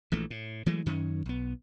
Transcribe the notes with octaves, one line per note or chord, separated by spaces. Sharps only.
A#1 E3 A3
A2
E3 F#3 G#3 A3
F#2 D#3 C#4
B1 B3